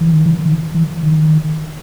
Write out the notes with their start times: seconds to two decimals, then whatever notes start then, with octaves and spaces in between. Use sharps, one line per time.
0.01 E3
0.13 D#3
0.26 E3
0.45 D#3
0.74 E3
1.03 D#3